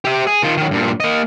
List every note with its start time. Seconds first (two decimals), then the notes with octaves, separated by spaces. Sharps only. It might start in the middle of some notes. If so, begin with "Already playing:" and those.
0.05 G4 E5
0.27 G#4
0.43 D#3 F4
0.57 D#3 F#3
0.71 G2 A#2
1.00 A#3 D#5